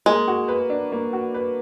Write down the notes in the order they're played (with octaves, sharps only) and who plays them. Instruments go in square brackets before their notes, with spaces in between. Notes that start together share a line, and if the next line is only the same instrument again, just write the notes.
[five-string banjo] G#3 [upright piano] A#3
[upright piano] F#4
B4
D4
A#3
F#4
B4